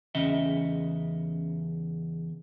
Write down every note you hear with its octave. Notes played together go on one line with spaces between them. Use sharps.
E2 C#3 C#4 D#5 E5